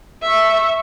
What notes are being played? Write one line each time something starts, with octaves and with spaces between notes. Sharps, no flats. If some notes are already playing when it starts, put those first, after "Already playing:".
E5 C#6